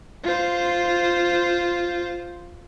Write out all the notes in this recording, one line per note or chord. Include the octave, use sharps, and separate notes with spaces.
F4 C5